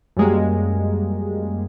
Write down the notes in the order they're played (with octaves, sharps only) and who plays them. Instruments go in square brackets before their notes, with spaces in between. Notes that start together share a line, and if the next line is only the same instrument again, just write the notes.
[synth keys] F#2 G3 G#3 A#3